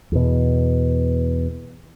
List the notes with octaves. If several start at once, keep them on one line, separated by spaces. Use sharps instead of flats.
E2 B2